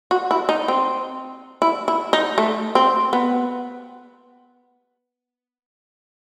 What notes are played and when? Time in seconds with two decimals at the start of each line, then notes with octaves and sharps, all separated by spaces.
0.11 F#4
0.31 E4
0.49 D#4
0.68 C4
1.62 E4
1.88 E4
2.13 D#4
2.38 A3
2.75 C4
3.13 B3